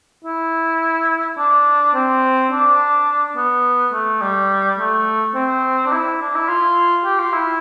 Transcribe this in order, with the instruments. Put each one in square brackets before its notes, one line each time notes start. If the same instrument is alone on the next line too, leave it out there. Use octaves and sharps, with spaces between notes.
[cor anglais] E4
D4
C4
D4
B3
A3
G3
A3
C4
D4
E4
D4
E4
F4
G4
F4
E4